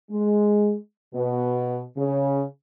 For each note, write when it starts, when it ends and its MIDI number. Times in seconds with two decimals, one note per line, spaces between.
0.11 0.74 56
1.14 1.80 47
1.97 2.42 49